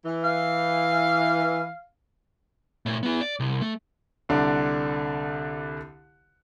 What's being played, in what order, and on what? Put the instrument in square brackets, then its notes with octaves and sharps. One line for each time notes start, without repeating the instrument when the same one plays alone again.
[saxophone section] E3
[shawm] F5
[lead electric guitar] A#2 A3
B3 E4
D5
C2
A3
[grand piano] C2 D3 D4